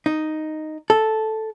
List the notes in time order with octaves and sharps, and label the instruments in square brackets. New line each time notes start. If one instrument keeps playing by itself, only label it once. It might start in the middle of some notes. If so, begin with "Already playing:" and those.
[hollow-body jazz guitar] D#4
A4